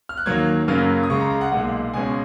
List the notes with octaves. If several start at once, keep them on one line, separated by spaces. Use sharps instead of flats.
F6
F#6
D#2 D#3 F#3 A#3 G#6
F#2 C#3 F#3 A#3 F6
D#6
C#2 C#3 G#3 C#6
A#5
A#5
F#5
B1 A#2 G#3 F#5
C#2 B2 G#3 C#4 G#5